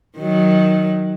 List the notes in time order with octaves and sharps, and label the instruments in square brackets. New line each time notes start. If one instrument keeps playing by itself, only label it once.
[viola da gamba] D#3 F#3